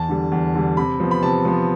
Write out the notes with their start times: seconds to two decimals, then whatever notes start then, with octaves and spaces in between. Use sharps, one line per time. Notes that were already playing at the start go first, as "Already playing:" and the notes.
Already playing: E2 A5
0.09 D3 G3
0.32 E2
0.55 D3 G3
0.77 C3 B5
1.00 F3 B3
1.11 B5
1.23 C3 A5
1.45 F3 B3